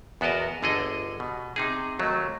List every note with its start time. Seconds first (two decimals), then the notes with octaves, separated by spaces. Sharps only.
0.21 E2 B3 F#4 A#4 D#5 A5
0.63 G1 D3 G#4 A4 D#5
1.20 B2
1.56 C3 D#4 G#4
1.99 D#2 F#3 A3